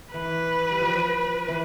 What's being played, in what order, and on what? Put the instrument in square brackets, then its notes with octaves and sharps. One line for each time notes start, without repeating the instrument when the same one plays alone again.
[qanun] E3 [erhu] B4
[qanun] G3
F3
[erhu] B4
[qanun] E3